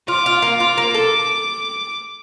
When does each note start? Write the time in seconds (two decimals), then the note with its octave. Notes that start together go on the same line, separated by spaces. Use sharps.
0.08 F4 D6
0.26 F4
0.42 A#3
0.60 F4
0.78 A#3
0.94 A4